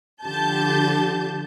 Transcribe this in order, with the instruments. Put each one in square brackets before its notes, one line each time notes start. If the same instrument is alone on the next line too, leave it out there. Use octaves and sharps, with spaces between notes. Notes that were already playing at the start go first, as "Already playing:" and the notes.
[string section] D3 F3 G4 A5 G6